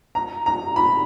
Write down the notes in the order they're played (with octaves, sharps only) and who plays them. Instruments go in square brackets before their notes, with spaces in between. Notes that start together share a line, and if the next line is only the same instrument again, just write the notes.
[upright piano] A#5
A#5
B5